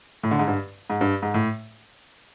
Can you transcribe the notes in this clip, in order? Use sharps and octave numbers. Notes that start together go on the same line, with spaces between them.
A2
D3
G#2
G2
G#2
G2
G#2
A2